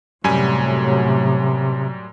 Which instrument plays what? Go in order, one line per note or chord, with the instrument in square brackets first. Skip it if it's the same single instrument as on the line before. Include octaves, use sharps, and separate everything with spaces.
[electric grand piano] F#2 G3 G#5 [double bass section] A2 F#3 [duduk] C3